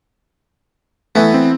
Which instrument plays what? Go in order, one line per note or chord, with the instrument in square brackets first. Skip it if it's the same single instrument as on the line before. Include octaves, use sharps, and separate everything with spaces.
[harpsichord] E3 B3 [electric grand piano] A3
[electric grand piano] C4